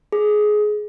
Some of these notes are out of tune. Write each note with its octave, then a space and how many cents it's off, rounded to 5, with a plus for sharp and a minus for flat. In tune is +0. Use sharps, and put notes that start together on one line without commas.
G#4 +20